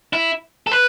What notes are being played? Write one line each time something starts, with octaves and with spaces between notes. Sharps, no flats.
E4
A4
B4